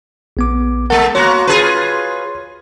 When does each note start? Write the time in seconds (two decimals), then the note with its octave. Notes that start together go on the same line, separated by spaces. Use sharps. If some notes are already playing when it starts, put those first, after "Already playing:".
0.37 A#1 B3 D6
0.90 G#3 A4 A#4 F#5
1.15 A#3 F#4 C#5 C6
1.47 F4 G#4 B4